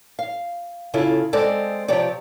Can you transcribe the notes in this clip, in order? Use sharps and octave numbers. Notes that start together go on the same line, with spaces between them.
F5
C#3 E4 F4 A4
G#3 C4 A4 D5
C3 F3 G4 C#5 D5